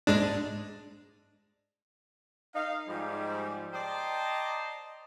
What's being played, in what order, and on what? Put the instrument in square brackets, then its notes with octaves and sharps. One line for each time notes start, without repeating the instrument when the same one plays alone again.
[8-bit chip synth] G#2 G#3 D4
[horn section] D#4 F5
G#2 F3 G3
C5 D5 D#5 G5 A5 A#5